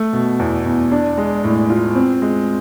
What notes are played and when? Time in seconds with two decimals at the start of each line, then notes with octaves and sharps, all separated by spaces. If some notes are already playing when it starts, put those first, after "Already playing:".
Already playing: A3
0.13 B2
0.39 E2
0.65 E2
0.91 D4
1.18 G#3
1.44 A2
1.70 F4
1.95 C4
2.22 G#3